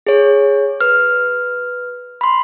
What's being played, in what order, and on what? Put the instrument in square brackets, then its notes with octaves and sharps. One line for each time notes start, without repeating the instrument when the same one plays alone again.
[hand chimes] G#4 C#5
B4 F6
B5 C6